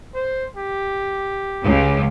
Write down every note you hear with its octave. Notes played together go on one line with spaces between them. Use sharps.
C5
G4
C#2